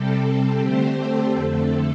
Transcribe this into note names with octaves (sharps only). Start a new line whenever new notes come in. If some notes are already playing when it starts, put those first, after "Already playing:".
Already playing: C3 G3 C4 A4
A4
D3 A3 C4 G4 C5
A4
F2 D3 A3 C4